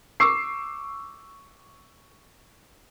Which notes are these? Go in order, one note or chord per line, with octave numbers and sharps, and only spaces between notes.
C#6 D6 E6 C7